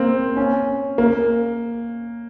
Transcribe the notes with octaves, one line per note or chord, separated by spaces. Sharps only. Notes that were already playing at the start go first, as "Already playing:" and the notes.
Already playing: A#3 C4
C#4
A#3